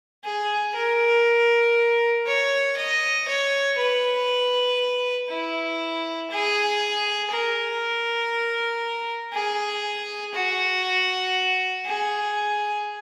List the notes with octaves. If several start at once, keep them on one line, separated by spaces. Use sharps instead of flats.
G#4
A#4
C#5
D#5
C#5
B4
E4
G#4
A#4
G#4
F#4
G#4